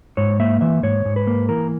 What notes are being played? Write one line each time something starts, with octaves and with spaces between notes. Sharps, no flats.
G#2 C#5
A#3 E5
E3 E5
G#2 C#5
G#2
B4
A#3
E3 A#4